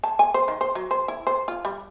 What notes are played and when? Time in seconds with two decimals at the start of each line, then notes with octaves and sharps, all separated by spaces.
0.04 A5
0.19 G#5
0.34 C5
0.48 D#3
0.61 C5
0.75 F#3
0.91 C5
1.08 E4
1.27 C5
1.48 F4
1.65 G3